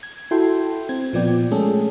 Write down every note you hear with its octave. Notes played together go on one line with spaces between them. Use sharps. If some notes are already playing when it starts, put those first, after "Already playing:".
G#6
E4 F#4 A4 G5 C6
C4 G#6
A#2 F3 B3 D5 G5
G#3 A3 C#4 G#4 A4